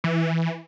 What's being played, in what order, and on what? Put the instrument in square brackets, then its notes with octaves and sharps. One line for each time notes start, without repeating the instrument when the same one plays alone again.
[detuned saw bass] E3